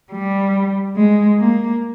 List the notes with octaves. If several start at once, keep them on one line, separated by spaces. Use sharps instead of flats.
G3
G#3
A#3